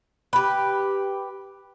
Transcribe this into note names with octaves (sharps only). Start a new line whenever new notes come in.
G4 B4